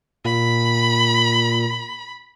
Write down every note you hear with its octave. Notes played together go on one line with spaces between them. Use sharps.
A#2 B5